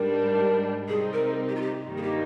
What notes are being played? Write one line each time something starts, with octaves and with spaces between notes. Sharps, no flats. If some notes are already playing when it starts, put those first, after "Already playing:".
Already playing: G#2 G3 D4 A#4
C3 G3 C4 D#4 G#4
A#4
G4
F4
G4
G2 D#3 G3 A#3
G#4
G4